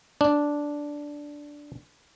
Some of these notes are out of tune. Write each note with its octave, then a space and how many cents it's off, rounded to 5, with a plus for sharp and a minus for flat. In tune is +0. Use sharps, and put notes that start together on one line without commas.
D4 -5